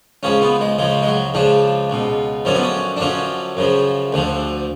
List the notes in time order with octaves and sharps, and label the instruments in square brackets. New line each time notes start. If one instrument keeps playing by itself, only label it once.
[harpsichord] C#2 C#3 F3 C#4
B3
G#3
C#2 C#3 F3 G#3
G#3
F#3
C#2 C#3 F3 D4
C#2 B2
F#2 D3 F3 C#4
B3
C#4
D4
F#2 D3 F3 C#4
F#2 C#3 F3
D2 D3 F3